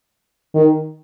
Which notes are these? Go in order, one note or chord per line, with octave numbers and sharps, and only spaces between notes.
D#3